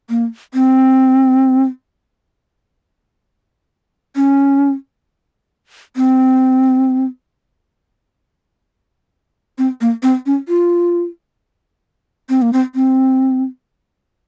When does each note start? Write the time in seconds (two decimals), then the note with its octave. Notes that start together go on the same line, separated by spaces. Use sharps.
0.10 A#3
0.54 C4
4.16 C#4
5.96 C4
9.58 C4
9.81 A#3
10.03 C4
10.26 C#4
10.48 F4
12.29 C4
12.42 A#3
12.53 C4
12.75 C4